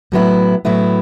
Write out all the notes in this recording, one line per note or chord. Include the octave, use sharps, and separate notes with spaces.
A2 F#3 B3 E4
A2 F#3 B3 E4